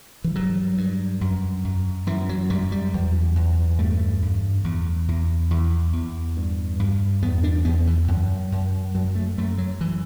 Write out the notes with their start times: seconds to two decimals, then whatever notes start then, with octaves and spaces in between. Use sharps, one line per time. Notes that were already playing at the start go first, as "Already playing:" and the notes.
0.24 E3
0.35 G2 F#3
0.78 G2
1.21 F#2
1.64 F#2
2.07 F#2 E3
2.29 F#3
2.50 F#2 G3
2.72 G3
2.94 E2
3.35 E2
3.78 G2 A3
4.22 G2
4.64 E2
5.08 E2
5.51 E2
5.93 E2
6.37 G2
6.79 G2
7.22 E2 B3
7.43 D4
7.65 E2 B3
7.87 E3
8.08 F#2
8.52 F#2
8.95 F#2 F#3
9.15 A3
9.38 F#2 A3
9.58 F#3
9.81 E3